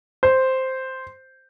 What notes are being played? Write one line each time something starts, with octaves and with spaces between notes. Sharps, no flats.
C5